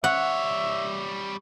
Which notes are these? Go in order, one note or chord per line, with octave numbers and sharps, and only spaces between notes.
G3 C#5 E5 F#5